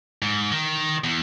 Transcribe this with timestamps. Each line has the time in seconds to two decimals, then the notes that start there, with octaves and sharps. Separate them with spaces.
0.22 G#2
0.52 D#3
1.04 E2